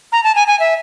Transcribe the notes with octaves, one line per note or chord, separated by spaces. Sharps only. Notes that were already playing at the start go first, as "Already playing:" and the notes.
A#5
A5
G#5
G#5
E5